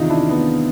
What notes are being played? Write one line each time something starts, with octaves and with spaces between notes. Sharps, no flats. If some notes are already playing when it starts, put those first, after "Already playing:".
Already playing: E2 C3 D#3 D#4 F4
D4 E4
B3